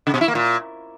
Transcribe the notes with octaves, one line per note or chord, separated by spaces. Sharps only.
C#3
B2
E4
A#3
A#2